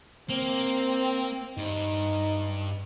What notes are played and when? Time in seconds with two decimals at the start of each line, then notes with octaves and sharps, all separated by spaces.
0.29 A#3 C4
1.57 G2 D#4